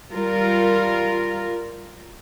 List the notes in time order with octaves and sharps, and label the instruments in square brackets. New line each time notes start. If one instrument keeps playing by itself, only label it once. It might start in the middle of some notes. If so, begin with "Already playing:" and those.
[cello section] G3 F4 A#4